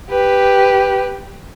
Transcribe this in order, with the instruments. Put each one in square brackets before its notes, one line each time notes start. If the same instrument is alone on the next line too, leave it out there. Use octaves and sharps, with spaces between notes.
[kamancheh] G4 B4